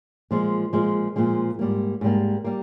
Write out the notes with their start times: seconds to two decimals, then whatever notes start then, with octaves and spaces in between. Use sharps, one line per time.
0.31 A#2 F3 G#3
0.73 A#2 F3 G#3
1.16 A#2 F3 G#3
1.59 G#2 G3 A#3
2.01 G#2 G3 A#3
2.44 G3 A#3